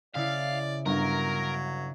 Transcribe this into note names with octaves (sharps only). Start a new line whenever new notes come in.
C#3 E4 D5 F5
G1 F#3 A#4